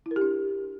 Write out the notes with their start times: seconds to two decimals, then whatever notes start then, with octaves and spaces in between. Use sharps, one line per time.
0.06 E4
0.11 A#4
0.16 G4
0.21 D4